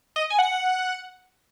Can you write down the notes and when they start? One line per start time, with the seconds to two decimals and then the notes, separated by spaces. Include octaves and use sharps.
0.16 D#5
0.30 G#5
0.39 F#5